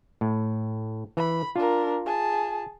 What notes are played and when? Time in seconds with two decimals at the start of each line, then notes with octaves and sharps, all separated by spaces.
0.21 A2
1.17 E3 B5
1.56 D4 F4 A#4
2.06 G#4 A5